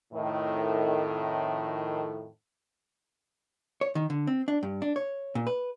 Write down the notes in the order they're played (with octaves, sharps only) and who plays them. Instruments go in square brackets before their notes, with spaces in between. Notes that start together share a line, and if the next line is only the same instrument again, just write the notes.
[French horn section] F2 A2 D#3
[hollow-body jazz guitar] C#5
D#3
D3
C4
D4
G2
D4
C#5
A#2
B4